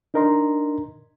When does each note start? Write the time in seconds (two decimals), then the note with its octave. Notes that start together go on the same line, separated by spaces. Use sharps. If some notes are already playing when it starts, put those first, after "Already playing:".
0.14 D4 D#4 A#4 D#5 A#5 C6